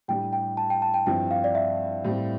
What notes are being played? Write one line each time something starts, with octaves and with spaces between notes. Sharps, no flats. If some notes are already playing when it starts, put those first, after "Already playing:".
A2 G3 D4 G4 G5
G5
A5
G5
A5
G5
G2 F3 C4 E4 G5
F5
D5
E5
A2 G3 C4